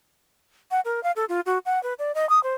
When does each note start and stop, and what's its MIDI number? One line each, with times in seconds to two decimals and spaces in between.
0.71 0.80 78
0.85 1.03 70
1.03 1.12 77
1.16 1.25 69
1.29 1.41 65
1.46 1.58 66
1.66 1.81 78
1.83 1.94 71
1.99 2.12 74
2.15 2.28 75
2.30 2.42 87
2.43 2.55 72